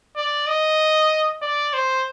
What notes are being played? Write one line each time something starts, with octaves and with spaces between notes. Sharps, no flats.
D5
D#5
D5
C5